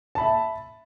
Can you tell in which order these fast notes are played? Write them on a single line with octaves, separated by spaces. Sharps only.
A5 B5 E5